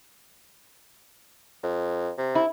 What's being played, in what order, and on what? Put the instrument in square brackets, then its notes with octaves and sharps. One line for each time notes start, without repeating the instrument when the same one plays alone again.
[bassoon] F2
C3
[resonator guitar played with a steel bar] E4